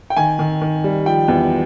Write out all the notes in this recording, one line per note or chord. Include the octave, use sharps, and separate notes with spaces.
G5
D#3 G#5
D#3
D#3
G3
F3 G5
E2